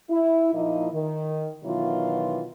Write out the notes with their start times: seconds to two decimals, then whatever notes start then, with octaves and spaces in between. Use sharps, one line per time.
0.10 E4
0.53 A#2 F3 A#3 D#4 E4 D#5
0.93 D#3
1.64 B2 D#3 E3 F#3 F4